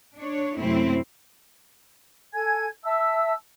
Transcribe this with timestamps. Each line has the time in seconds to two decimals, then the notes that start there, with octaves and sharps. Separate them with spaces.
0.18 D4 C#5
0.58 F#2 C3 A3 C4 E4
2.33 A4 G#5 G#6
2.84 E5 A5 E6